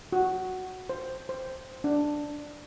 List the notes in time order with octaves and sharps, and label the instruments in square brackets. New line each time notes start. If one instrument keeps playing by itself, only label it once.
[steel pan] F#4
C5
C5
D4